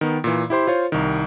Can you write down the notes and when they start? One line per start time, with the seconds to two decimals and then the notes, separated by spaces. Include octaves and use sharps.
0.01 D#3 B3
0.24 A#2 E3
0.50 E4 G4 C5 C6
0.67 F4 C5 C#5
0.92 C2 D#3